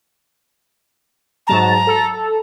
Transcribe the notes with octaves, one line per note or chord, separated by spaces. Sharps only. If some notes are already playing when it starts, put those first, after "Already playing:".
G#2 F#3 A5 A#5
A4